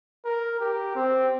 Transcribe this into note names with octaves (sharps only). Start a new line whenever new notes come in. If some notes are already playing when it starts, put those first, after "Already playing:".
A#4
G4
C4